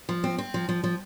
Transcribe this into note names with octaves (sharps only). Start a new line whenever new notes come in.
F3
C4
C4
F3
F3
F3